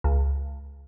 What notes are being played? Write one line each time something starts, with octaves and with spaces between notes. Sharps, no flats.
C#2